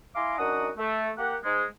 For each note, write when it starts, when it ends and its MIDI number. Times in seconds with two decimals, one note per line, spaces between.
0.15 0.38 64
0.15 0.38 77
0.15 0.38 80
0.15 0.38 82
0.15 0.38 84
0.15 0.38 86
0.39 0.70 42
0.39 0.70 62
0.39 0.70 63
0.39 0.70 66
0.39 0.70 78
0.39 0.70 87
0.78 1.10 57
1.18 1.36 58
1.18 1.36 67
1.18 1.36 78
1.44 1.65 44
1.44 1.65 56